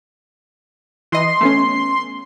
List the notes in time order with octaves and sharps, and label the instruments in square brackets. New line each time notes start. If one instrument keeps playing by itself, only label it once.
[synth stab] E3 D#5 [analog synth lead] C6
[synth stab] A3 B3 C#4